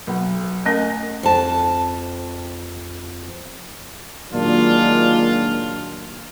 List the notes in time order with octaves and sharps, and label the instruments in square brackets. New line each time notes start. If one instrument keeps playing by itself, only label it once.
[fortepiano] B1
[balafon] A3 C#4 A#4 [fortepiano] D#5 G#5
[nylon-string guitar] F2 A5
[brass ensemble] A#2 D#3 F#3 G#3 D4 F4